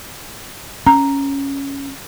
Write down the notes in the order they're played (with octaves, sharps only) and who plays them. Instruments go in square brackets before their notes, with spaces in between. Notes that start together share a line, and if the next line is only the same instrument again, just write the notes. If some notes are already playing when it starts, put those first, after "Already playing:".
[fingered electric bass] C#4 [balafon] A#5